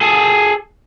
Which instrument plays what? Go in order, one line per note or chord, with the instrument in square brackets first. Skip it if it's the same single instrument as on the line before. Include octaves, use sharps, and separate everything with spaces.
[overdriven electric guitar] G#4 A4